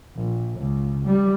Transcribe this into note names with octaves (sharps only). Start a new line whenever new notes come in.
A#1
C#2
G3